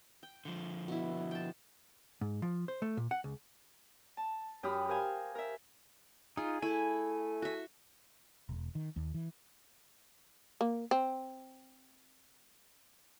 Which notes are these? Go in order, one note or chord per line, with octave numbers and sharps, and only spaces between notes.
G5
D3 F3
B2 E4
G5 A5
G#2
F3
C5
A3
A#2
F#5
C#2
A5
F#2 G4 B5 D#6 F6
G4 A#4 C5 F5 G#5
A#4 E5
D#4 F4 G#4
A3 E4 G#5
F#4 E5
E1
D#3
D#2
E3
A#3
C4